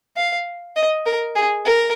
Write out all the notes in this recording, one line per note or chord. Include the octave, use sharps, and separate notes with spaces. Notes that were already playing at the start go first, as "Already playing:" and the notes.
F5
D#5
A#4
G#4
A#4